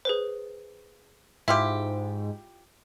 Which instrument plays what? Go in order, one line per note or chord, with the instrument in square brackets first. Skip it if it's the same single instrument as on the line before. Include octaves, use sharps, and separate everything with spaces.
[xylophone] G#4 B4 C5
[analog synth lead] G#2 [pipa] E4 F4 G4 [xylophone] E5